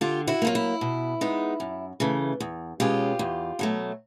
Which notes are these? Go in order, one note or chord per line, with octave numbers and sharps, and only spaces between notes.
D3 F4 G4
E4 F#4
F#3 A#3 F4
E4
B2
G#3 B3 D#4
F#2
C#3 E3 A3
E2
B2 G#3 C#4 F4 G4
E2
B2 F#3 A3